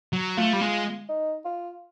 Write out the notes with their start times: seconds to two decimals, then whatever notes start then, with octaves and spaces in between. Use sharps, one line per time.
0.13 F#3
0.37 A3 F4
0.53 G3
0.61 G#3
1.09 D#4
1.45 F4